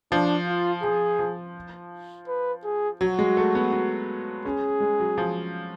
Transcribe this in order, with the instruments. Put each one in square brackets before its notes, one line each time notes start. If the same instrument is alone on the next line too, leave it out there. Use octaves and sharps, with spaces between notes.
[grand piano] F3 [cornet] D4
[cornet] F4
[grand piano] F3 [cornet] G#4
[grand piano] F3
[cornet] B4
G#4
[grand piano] F#3 [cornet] F#4
[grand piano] G#3
A3
B3
B3
[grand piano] C#4 [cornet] G#4
[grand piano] G#3
F#3
F3